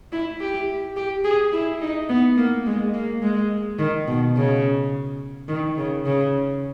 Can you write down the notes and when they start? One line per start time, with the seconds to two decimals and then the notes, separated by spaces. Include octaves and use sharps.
0.12 E4
0.40 G4
0.96 G4
1.24 G#4
1.52 E4
1.81 D#4
2.09 B3
2.37 A#3
2.66 G#3
2.94 A#3
3.22 G#3
3.79 D#3
4.07 B2
4.36 C#3
5.48 D#3
5.77 C#3
6.06 C#3